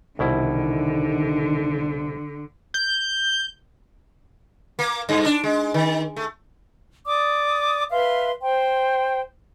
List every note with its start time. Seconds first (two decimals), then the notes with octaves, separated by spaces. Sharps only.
0.19 C2 B2 D3 D#3 E4
2.74 G6
4.79 A#3
5.09 G2
5.25 D4
5.44 G#3
5.74 D#3
6.16 A3
7.06 D5 D6 D#6
7.90 B4 E5 F5 C6
8.41 C5 G5 C6